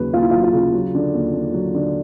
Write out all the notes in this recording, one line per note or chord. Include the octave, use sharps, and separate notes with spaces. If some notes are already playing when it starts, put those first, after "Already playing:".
Already playing: D#2 C#3 F#3 B4
D#2 F4
E4
F#3 F4
F4
C#3
F#3
D3
D#2
D#2
F#3
D3